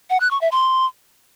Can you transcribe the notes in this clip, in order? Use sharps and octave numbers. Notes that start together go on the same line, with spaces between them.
F#5
F#6
C#6
E5
C6